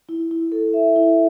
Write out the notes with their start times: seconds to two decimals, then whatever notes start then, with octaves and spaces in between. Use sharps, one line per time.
0.09 E4
0.31 E4
0.52 A4
0.74 E5
0.96 E4